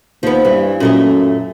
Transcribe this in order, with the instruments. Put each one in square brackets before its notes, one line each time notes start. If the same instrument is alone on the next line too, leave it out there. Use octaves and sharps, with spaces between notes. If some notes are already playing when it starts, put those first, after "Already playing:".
[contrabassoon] D#2 [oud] F3 B3
[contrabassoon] G2 [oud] E3
[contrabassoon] F#2 [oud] A#2 A3 D#5